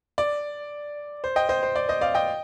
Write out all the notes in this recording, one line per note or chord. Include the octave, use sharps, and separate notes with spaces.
D5
C5
D#5 G5
C5 D#5
C5
D5
C5 D#5
D5 F5
D#5 G5